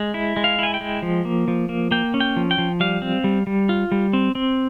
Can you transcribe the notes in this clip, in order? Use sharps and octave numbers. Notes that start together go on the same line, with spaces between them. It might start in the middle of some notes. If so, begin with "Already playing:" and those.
Already playing: G#3
E4
G#3
F5
E4 G#5
G5
G#3
F3
A#3
F3
A#3
A#3 G5
C#4
G5
F3
G5
F3
G3 F5
C4
G3
G3
F4
G3
C4
C4